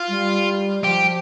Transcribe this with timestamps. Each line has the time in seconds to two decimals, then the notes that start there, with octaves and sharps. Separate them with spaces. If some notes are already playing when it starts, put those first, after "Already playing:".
Already playing: F4
0.09 G3
0.84 F3 G4